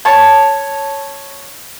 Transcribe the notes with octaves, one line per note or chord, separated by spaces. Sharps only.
C#5 A5